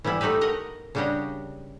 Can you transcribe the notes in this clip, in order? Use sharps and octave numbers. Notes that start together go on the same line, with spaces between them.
E3 G3 B3 E4
A3 D#4 F#4 G4 B4
A#4 D#5 F#5
C#3 G3 D4 F#4 G4 D#5